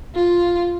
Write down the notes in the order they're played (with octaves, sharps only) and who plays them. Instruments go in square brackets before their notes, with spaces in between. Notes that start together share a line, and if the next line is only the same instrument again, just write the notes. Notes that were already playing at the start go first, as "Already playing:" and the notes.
[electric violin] F4